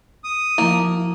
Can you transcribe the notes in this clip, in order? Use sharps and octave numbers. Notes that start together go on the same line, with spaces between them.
D#6
F3 A#3 E4 F#4 D7